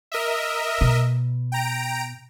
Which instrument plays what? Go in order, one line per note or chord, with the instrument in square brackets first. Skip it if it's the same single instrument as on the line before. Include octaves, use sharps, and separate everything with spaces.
[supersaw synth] A#4 D#5 E5
[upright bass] B2
[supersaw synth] G5 A#5 D7